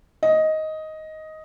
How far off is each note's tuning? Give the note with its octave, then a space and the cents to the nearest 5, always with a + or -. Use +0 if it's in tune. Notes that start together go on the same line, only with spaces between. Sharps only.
D#5 +10